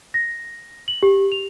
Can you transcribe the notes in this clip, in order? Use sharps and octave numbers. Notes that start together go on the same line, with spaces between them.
A#6
F#7
G4
F7